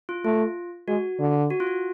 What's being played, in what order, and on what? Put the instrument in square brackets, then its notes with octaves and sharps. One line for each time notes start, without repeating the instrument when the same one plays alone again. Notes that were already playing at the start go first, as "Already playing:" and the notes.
[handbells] F4
[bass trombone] A3 [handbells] F4
[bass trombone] G#3 [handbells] F#4
[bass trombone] D3
[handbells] F#4
F4
F#4